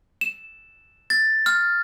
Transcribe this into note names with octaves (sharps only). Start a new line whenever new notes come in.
E7
A6
F6